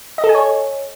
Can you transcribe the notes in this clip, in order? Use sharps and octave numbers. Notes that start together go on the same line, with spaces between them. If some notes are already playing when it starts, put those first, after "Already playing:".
D#5
A4
G#5
C#5